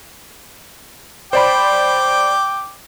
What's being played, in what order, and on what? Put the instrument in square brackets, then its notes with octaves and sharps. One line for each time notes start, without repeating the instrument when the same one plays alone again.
[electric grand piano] C5 D5 B5 [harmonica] G5 D6